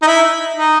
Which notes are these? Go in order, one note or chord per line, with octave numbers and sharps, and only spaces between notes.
D#4
E4
D#4